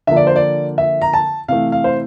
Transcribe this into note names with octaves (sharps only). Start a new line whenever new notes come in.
D3 F3 A#3 E5
D5
C5
D5
E5
A#5
A5
C3 E3 A3 F5
F5
C5